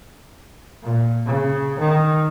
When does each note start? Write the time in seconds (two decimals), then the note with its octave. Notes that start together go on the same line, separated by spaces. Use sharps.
0.83 A#2
1.26 C#3
1.79 D#3